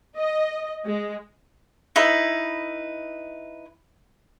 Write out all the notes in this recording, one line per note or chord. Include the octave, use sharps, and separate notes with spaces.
D#5
G#3
D#4 E4 B4